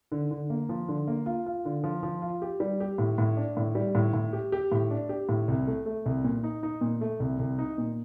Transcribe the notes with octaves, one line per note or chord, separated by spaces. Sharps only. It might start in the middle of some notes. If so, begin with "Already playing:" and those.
D3
D3
A#3
F3
D3
A#3
F4
F4
D3
F3
F3
F4
G4
G3
G4
A2
A2
D4
A2
G3
A2
A2
G4
G4
A2
D4
G4
A2
C2
A3
A3
C2
A#2
D#4
D#4
A#2
A3
C2
C2
D#4
A#2